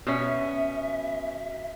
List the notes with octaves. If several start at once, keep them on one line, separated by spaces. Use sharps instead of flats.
B2 C#4 E5